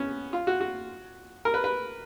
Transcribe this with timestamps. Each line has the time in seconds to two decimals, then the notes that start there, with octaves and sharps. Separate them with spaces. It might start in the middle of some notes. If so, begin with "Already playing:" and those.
Already playing: B3 C#4
0.33 F4
0.47 F#4
0.61 F#4
1.45 A#4
1.54 B4
1.64 B4